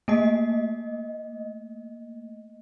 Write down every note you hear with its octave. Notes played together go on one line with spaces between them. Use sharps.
A3 A#3 D#5